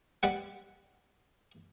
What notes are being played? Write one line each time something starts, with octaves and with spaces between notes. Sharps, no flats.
G3 D5 F#5